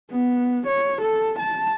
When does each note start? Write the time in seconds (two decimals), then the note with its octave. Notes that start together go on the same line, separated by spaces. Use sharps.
0.12 B3
0.67 C#5
1.01 A4
1.39 A5